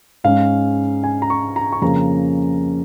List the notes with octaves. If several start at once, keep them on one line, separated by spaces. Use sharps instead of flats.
G#2 G#3 C#4 F5
G#5
A#5
C#6
A#5
C#6
F2 C#3 A#3 C#4 A#5